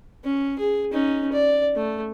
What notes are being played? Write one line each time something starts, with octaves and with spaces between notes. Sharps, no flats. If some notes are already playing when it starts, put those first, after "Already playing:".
C#4
G#4
C#4 D#4
D5
A3